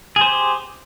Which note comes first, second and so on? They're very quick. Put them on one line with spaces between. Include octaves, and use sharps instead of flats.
G#4 C5 G4